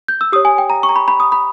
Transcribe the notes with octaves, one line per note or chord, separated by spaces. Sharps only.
G6
E6
G4 C#5 D#6
G#5
G5
A#5
C#6
A#5
B5
B5
D#6
B5